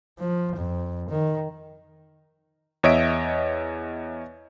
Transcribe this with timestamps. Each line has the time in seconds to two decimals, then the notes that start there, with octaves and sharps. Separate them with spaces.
0.19 F3
0.57 F2
1.09 D#3
2.83 E2 C#5 D#5 E5 D7